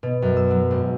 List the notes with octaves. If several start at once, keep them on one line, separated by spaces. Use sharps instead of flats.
B2
F#2
E6
F#3
G#1